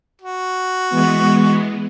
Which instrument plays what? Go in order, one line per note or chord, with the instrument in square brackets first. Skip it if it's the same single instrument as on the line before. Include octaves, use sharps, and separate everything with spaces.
[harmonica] F#4
[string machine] E3 G#3 B3